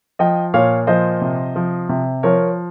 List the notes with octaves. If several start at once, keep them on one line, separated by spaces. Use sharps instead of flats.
F3 D#5 G5
A#2 C#5 F5
F3 C5 D#5
C3
F3
C3
F3 A#4 C#5